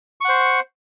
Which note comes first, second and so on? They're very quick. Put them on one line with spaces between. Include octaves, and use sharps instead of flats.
C#6 F#5 C5